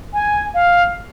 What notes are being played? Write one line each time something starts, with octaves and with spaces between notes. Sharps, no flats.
G#5
F5